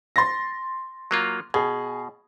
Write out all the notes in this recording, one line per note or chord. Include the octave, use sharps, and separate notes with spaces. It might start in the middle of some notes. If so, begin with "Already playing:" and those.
C6 A6 A#6
F#3 A#3 F4
B2 G#4